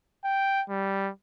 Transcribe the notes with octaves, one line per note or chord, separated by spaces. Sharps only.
G5
G3